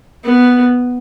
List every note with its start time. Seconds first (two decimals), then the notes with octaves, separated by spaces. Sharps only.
0.24 B3